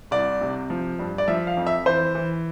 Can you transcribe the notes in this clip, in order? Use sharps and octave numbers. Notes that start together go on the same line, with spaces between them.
C2 D5
C3
F3
G2
D5
F3 E5
F5
F2
E5
E3 C5
E3